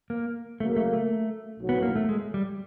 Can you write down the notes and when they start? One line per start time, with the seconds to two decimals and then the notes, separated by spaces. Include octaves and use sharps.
0.10 A#3
0.60 C#3 F#3 A3 A#3
0.76 A3
0.93 A3
1.59 B1 A2 F#3
1.69 B3
1.82 A#3
1.96 A3
2.09 G#3
2.34 G3